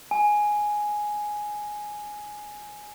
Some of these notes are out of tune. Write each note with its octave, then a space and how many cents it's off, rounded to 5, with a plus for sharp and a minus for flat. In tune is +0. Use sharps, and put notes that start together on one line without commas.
G#5 +5